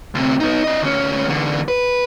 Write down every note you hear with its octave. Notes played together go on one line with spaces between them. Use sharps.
D2 C3
B3 D#4
D4 D#5
D2 C#4
E2 D3
B4